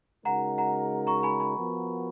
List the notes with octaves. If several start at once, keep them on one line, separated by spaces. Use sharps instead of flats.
C#3 G#3 D#4 F#4 A#4 F#5 A#5
F#5 A#5
A#5 C#6
G#5 B5
G#5 B5
F3 B3 F#4 A#4